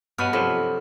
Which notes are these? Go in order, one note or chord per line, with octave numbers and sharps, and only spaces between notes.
G2 B2 B4 D#5 F#5 F6
C3 F3 F#3 A4 B5